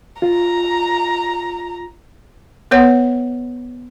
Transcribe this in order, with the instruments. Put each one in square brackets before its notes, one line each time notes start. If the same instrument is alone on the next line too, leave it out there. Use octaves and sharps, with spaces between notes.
[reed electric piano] F4 [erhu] A#5
[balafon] B3 B4 C#5 F#5